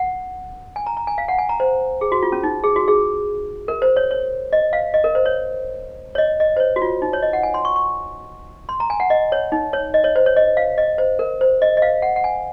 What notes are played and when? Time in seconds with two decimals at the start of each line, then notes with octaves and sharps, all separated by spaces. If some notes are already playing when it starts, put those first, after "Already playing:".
Already playing: F#5
0.76 G#5
0.86 A#5
0.97 A#5
1.07 G#5
1.18 F5
1.28 F#5
1.38 G#5
1.49 A#5
1.60 C5
2.01 G#4
2.12 F#4
2.23 F4
2.32 C#4
2.43 D#4
2.64 G#4
2.76 F#4
2.88 G#4
3.68 A#4
3.82 C5
3.96 C#5
4.11 C#5
4.53 D#5
4.73 F5
4.94 D#5
5.04 A#4
5.15 C5
5.26 C#5
6.15 C#5
6.18 D#5
6.40 D#5
6.57 C5
6.60 C#5
6.76 F#4
6.82 F4
7.02 D#4
7.13 C#5
7.22 D#5
7.33 F#5
7.43 G#5
7.54 C6
7.65 C#6
7.76 C#6
8.69 C6
8.80 A#5
8.90 G#5
9.00 F#5
9.10 D#5
9.32 C#5
9.52 D#4
9.73 C#5
9.94 D#5
10.04 C#5
10.16 C5
10.26 C#5
10.36 D#5
10.57 F5
10.78 D#5
10.98 C5
11.19 A#4
11.41 C5
11.62 D#5
11.77 D#5
11.82 F5
12.02 F#5
12.16 F#5
12.24 G#5